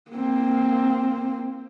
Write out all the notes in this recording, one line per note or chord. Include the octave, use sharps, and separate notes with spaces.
A#3 C4